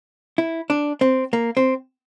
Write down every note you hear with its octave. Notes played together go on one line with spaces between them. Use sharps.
E4
D4
C4
A#3
C4